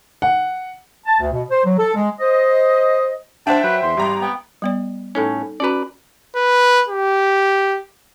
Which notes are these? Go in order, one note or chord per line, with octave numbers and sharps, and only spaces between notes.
F#5
A5
D2
B2
C5
F#3
A4
G#3
C5 D#5
D4 C5 E5 F#5 G5 A5
F#3 B4
E2 C6
G#1 G3 A#5
B3 G5
G3 B3 D5
A2 C#4 D#4 A4
C#4 F#4 B4 D5 A#5
B4
G4